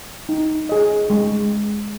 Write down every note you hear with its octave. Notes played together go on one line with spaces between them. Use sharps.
D#4
G#4 D#5
G#3